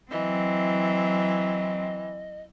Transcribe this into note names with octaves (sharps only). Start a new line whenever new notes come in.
E3 F#3 C4 D#5